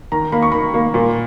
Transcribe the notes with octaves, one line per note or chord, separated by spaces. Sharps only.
D#3 A#5
A#3 B5
C#6
D#3 B5
A#3
A#2